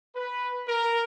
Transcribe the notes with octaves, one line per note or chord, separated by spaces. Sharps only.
B4
A#4